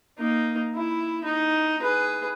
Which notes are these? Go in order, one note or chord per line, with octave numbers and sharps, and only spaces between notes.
A#3 D#4
E4
D#4
G#4 B4